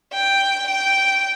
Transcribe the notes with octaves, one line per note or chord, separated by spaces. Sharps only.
G5
G5